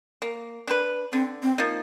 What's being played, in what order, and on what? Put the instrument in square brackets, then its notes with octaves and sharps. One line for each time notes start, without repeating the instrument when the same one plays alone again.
[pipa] A#3
D4 G4 B4
[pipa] D3 [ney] C4
[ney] C4
[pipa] F3 A#3 D#4